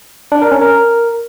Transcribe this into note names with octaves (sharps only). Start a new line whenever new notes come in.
D4
A#4
C#4
A#4